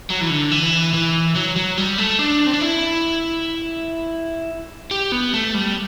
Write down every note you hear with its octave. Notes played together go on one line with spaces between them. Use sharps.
F#3
E3
D3
E3
E3
F#3
F#3
G3
A3
D4
C4
D4
E4
G4
B3
A3
G3